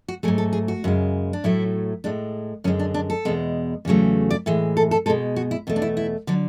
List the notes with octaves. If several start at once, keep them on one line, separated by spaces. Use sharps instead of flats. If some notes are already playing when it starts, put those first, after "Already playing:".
F#4
G#2 F#3 A3 G#4
A4
G#4
F#4
F#2 C#3 G#3
D4
A2 F#3 A3 E4
A2 G#3 D4
F#2 D3 G#3 C#4
D4
D4
A4
E2 B2 G#3
E2 C#3 F#3 A3
D5
A2 E3 G#3
A4
A4
B2 G#3 A4
F#4
E4
E2 B2 A3
D4
E4
E4
D3 F#3 D4